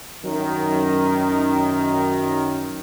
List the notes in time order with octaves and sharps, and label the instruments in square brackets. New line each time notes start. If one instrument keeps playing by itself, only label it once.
[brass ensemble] F#2 D#3